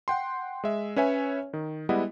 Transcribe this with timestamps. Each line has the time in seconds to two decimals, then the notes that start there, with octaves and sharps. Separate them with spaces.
0.08 F#5 G5 C6
0.64 G#3 E5
0.96 C#4 B4 C#5 E5 G#5
1.53 D#3
1.89 G3 G#3 B3 E4 D#5 F#5